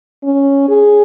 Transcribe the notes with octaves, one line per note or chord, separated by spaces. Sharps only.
C#4
G#4